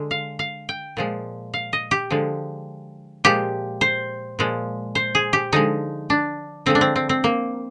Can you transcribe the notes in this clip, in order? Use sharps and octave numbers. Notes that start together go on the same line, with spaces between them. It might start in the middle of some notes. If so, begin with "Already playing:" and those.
Already playing: D3 G#3
F5
F5
G5
A#2 F3 G#3
F5
D#5
G4
D3 F3 G#3
A#2 F3 G#3 G4
C5
A#2 F3 G#3
C5
G#4
G4
D3 F3 G#3 D#4
D4
D3 F3 G#3 C4
D4
C4
C4
C4
A#3